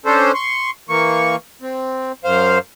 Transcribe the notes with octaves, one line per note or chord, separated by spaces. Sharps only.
C#4 D4 A4 C5
C6 C#6
E3 A#3 C#6
C4
F#2 C5 F5